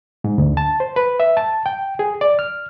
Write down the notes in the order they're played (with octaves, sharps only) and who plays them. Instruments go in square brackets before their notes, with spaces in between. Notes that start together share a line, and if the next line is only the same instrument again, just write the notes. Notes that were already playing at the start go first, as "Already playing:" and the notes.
[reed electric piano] G#2
D2
A5
C5
B4
E5
A5
G5
G#4
D5
F6